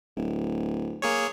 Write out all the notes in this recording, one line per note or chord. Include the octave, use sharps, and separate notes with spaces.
D1
A#3 G#4 C#5